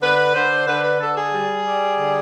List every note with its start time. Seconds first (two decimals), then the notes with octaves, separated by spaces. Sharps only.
0.02 D3 B4
0.35 D3 C5
0.67 D3 B4
0.83 B4
1.00 D3 A4
1.16 G#4
1.33 G3
1.65 G3
1.99 D3